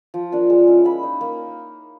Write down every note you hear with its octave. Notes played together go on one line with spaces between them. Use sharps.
F3
A#3 D4 F4
G#3
C#4 E4
A#3 B5
D#4
A#3